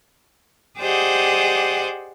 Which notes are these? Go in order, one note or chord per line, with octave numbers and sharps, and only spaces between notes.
G4 G#4 C5 D5 D#5 F#5